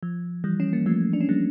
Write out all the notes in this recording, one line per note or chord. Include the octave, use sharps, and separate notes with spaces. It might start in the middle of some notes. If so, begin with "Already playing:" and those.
F3
E3 G3
C#4
A#3
F3 A3
D4
C#4
G3 A#3